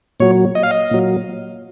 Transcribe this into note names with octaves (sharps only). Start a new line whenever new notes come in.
A#2 F#3 C#5
D#5
F5
D#5
A#2 F#3